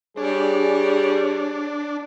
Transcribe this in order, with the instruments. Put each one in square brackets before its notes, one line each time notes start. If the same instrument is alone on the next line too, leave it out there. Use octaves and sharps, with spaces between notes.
[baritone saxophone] G3 [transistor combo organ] D4 [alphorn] G#4 [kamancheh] C#5